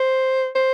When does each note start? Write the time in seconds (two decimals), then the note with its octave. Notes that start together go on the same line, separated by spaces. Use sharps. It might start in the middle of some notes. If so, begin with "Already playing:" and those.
Already playing: C5
0.55 C5